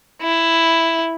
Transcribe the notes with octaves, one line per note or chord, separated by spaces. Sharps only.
E4